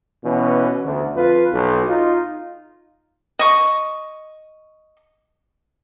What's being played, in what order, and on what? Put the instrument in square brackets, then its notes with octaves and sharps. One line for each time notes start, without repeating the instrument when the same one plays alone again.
[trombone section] B2 E3 C#4
D2
F2 F4 B4
B1
D#4 F4
[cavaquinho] D#5 C#6